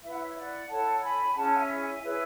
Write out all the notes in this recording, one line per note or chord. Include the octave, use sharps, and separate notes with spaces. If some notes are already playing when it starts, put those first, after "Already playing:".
E4 B4 E5
F#5
C#5 E5
D5 F#5
E4 A4 C#5 F#5 A5
A5
G#5 B5
C#4 E4 G#4 C#5 F#5 A5
E5 G#5
E5 G#5
E4 G#4 B4 C#5 E5